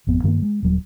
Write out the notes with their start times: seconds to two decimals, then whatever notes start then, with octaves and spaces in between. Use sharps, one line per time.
0.07 G#1 F2 B3 C4
0.24 G2 D#3 A3 A#3
0.42 G#3
0.62 D#1 D#2 F#3 G3